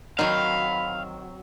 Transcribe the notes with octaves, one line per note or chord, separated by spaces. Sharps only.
D#3 F#3 C4 F5 B5